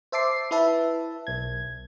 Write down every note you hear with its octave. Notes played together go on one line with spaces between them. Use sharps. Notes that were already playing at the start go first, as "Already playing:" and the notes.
C5 E5 A5 D6 C7
E4 B4 E5 A5
B1 G#6